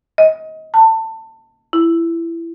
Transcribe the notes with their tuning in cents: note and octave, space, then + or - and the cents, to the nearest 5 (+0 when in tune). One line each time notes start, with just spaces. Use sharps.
D#5 +25
A5 +25
E4 +20